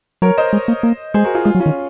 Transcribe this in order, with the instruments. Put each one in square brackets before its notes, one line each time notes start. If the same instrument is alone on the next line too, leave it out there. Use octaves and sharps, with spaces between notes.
[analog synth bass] F#3 [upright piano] A#4 C#5
[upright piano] C5 D#5
[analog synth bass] G#3
A#3
A#3
[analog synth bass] G#3 [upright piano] G#4 C5
[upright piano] F#4 A#4
F4 G#4
[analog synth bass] G#3 [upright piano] F4 G#4
[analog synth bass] F#3
[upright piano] C#4 F4
[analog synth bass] D#3